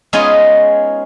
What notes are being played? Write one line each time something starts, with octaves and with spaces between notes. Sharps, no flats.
G#3 B3 C#4 D#4 F4 G#4